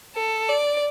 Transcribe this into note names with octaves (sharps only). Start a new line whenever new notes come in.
A4
D5